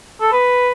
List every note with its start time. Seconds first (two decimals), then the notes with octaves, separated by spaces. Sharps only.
0.21 A4
0.32 B4